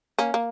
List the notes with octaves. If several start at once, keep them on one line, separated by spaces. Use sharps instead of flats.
A#3 C#4
A#3